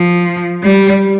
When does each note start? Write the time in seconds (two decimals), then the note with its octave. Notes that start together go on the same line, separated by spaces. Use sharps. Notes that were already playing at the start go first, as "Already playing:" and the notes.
Already playing: F3
0.63 G3